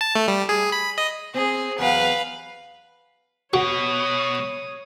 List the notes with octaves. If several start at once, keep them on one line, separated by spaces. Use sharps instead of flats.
A5
A3
G3
G#4
B5
D#5
C4 G#4
E2 F#3 B4 F5
B2 F#4 C#5 D#6